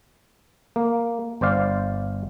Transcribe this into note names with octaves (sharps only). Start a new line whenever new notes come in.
A#3
G1 C5 D5 F5